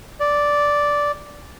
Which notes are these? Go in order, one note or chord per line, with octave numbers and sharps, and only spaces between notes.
D5